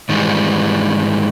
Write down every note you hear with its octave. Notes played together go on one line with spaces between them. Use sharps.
G#2 D#3 E3 G3 G#3